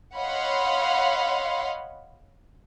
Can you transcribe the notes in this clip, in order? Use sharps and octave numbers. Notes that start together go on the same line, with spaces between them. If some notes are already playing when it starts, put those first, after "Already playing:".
C#5 D#5 F5 F#5 B5 C6